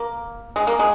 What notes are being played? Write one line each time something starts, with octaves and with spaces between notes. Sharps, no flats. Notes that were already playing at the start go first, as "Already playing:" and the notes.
Already playing: A#3
G#3
A#3
G#3